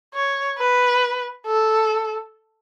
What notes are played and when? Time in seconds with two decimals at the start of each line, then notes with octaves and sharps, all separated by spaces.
0.14 C#5
0.58 B4
1.47 A4